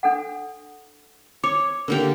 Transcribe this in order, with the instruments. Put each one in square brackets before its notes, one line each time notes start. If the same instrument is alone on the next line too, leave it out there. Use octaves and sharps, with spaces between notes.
[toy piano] D4 A4 F#5
[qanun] C#5 [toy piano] D6
[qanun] D3 A#3 G4 [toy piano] A#4